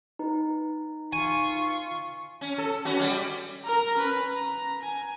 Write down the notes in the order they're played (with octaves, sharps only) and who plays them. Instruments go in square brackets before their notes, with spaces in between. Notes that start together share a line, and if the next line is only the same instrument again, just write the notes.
[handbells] D#4 B4
[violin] F4 C#6 [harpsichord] G#5
[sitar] C#4
A4
B3 C#4 F#4
G3 D5
[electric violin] A#4 A#5
C#4 B4
A#5
G#5